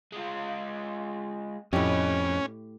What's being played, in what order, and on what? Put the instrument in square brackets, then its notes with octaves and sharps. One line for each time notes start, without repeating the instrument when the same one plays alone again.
[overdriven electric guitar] G#3 F4
[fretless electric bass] F2 [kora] A2 G4 [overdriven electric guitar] C4 D#5 [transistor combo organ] C#4